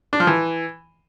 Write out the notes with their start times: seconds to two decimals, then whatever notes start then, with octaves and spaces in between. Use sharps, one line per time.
0.13 D4
0.20 F3
0.27 E3